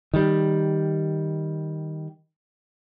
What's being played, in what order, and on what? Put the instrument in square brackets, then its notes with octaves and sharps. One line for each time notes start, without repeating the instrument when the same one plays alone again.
[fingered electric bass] D#3 G3